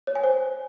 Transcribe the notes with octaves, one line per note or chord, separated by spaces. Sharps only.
C#5
G#5
C5